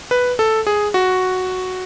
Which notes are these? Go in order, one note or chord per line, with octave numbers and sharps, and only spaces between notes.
B4
A4
G#4
F#4